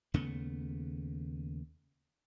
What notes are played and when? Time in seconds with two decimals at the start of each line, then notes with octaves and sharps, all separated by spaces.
0.14 D#2 C#3 A3 B3